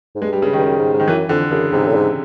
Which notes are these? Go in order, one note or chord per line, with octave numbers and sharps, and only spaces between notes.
G#2
G2 G#3
G3
C#3
G2 D#3
F#2
G#2
G#2
D#3
F#2 E3
F2 D3
F#2 C#3
G#2 C3
A2
G#2